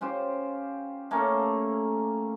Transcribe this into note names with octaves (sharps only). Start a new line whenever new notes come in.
C#4 F4 G4 C5
A3 A#3 C#4 A4